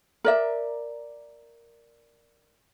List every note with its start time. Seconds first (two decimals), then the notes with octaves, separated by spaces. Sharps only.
0.25 A#4 D5 E5